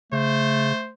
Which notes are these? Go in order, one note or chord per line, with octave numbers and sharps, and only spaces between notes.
C#3 A3 C5